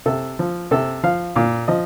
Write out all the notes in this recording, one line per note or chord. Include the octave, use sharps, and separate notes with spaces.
C3 A4
F3
C3 A4
F3 F5
A#2 F5
F3 D#5